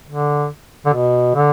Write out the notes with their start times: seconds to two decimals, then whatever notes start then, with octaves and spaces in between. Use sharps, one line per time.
0.09 D3
0.86 D3
0.94 B2
1.35 D3